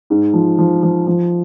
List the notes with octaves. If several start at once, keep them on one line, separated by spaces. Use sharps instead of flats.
G#2
F3
F3
F3
F3